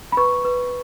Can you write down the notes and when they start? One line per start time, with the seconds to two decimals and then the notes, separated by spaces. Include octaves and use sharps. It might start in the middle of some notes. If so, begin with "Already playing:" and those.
0.12 B5
0.17 B4 C#6
0.45 B4